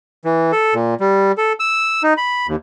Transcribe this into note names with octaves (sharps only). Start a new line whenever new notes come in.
E3
A4
A#2
G3
A4
E6
D#4
B5
D#2